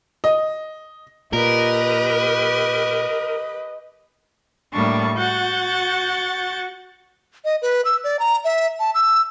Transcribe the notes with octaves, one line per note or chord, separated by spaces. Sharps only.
D#5
A#2 G4 A#4 B4 D#5
A2 G3 A#3 D4 C#6
F#4 F#5 C#6 G6 A6
D#5
B4
E6
D5
A#5
E5
A5
E6